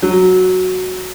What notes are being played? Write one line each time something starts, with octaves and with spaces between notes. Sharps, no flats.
F#3